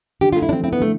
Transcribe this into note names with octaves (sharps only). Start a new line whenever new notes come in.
D3 G4
A3 F4
E4
F3 C4 D4
C4 E4
B3
D3 A3